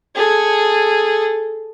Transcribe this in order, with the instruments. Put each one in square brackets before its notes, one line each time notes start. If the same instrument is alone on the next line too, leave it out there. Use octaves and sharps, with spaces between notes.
[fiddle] G#4 A4